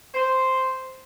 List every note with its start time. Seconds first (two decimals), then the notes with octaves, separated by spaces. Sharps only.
0.15 C5